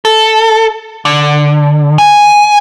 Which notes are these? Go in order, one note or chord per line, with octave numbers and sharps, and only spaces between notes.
A4
D3
G#5